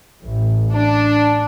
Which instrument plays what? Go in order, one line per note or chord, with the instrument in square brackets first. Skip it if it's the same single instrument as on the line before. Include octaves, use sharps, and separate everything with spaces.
[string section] A1
D4